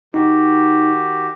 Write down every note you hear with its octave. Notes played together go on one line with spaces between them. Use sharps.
D#3 D#4 F#4 G4